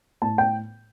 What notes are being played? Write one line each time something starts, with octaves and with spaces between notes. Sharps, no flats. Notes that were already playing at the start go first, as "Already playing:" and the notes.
A2 A5
G5